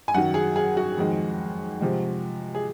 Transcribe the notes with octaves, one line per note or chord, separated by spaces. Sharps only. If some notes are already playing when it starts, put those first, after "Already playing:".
G#5
F#2 D#3 F#3 F#5
G#4
G#4
F#4
F2 D#3 G#3
C3 F3 G#3
G#4